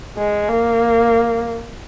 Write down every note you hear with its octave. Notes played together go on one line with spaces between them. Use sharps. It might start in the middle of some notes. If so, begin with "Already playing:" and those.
G#3
A#3